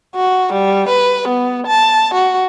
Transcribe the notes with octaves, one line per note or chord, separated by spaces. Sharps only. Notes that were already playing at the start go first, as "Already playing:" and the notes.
F#4
G3
B4
B3
A5
F#4